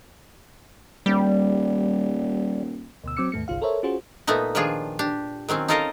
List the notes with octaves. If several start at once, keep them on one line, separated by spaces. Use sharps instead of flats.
D#1 G3
D2 B2 E6
F#3 C4 D6 E6 C#7
D#2 G#2 A3 C#7
G1 C2 F4 F5
A4 A#4 C5 C#5 E5
C#4 F4 F#4 G#4 C5
A#2 A3 B3 D#4
D#3 F3 D4 F4 G#4
D4 G4
D#3 F#3 C4 C#4
D#4 F4 A4 A#4 D#5 F5